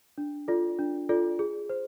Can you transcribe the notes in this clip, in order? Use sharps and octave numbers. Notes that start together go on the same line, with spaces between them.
D4
F4 A4 D5
D4
F4 A4 D5
G#4
C5